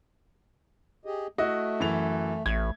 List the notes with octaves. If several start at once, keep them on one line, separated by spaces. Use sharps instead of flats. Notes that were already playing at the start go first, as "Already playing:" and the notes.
G4 G#4 D#5
A3 E4 F#4 D#5
F#2 E3 F7
A1 A3 G#6